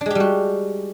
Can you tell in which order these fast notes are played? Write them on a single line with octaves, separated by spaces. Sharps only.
D4 G#3 G4 G3 F#4